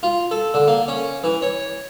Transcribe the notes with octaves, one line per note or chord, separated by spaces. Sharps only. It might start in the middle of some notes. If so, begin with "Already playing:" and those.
F4
A4
D3
A#3
C#4
E3
C#5